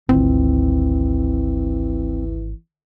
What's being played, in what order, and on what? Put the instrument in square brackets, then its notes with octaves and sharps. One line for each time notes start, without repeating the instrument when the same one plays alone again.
[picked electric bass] G#1 [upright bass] D2 F4 [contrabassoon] E3 [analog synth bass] C4